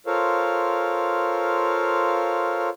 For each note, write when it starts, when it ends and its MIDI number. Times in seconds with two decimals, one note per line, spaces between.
0.07 2.69 65
0.07 2.69 69
0.07 2.69 70
0.07 2.69 72
0.07 2.69 73
0.07 2.69 77